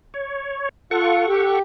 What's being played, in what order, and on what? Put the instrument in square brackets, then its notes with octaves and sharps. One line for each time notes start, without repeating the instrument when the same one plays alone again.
[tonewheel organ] C#5
[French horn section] F4 [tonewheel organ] A4 F#5 C#6
[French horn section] G4